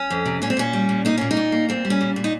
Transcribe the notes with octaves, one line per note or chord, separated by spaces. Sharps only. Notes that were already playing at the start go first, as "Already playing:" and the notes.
Already playing: C#4
F2
C3
A#2 C#4
C4
A#2 C#4
G3
A#2
A#3 D#4
A#2 C#4
D#4
A#2
A#3
A#2 C4
G3
C#4
A#2
A#2
D#4